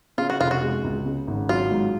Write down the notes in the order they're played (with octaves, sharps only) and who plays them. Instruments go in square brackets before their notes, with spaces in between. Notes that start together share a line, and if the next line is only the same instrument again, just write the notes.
[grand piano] C#3 [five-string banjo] F4
[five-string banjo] F#4
[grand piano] F1 [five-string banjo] F4
[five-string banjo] F#4
[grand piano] G#3
C#2
C#3
G#1
[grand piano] F#3 [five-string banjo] F4
[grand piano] G#2